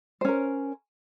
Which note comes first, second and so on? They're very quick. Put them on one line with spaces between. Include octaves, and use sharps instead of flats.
C5 C#4 A#4